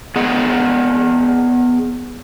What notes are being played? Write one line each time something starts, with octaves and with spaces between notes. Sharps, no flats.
B3 G#4 D#5 F#5